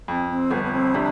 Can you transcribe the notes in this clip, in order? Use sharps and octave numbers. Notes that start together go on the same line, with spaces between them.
F2 C4
C4
G1 B3
B3
C4
C3 D4